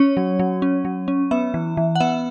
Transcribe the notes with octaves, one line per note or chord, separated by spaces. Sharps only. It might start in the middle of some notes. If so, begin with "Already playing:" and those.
Already playing: C#4 C#5
F#3
F#3
C#4
F#3
C#4
B3 E5
E3
E3
F#5
B3 E5